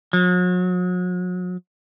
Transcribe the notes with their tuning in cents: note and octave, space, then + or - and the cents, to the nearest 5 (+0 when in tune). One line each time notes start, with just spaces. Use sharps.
F#3 -40